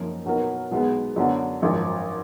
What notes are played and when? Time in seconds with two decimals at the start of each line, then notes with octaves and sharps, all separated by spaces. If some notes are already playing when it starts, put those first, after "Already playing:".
Already playing: F#2 F3 A#3 D#4
0.25 B2 F#3 B3 D#4 A#4
0.71 B1 B2 G#3 B3
1.16 F#2 D3 F#3 B3
1.62 G#1 F#2 F3